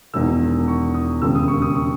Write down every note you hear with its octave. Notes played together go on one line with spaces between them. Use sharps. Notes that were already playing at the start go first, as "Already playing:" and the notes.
E1 E2 D#3 E6
C#6
D#6
E1 D#2 C#3 E6
D#6
C#6
D#6
C#6